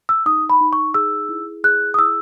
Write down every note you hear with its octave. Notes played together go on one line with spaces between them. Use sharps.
E6
D#4 D#6
B5
D#4
C#6
G#4 E6
E4
G#4 F#6
D#6
E4 E6